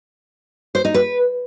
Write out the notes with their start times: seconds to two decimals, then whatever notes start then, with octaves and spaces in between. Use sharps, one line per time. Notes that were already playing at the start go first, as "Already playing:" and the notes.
0.75 C5
0.85 D#4
0.94 B4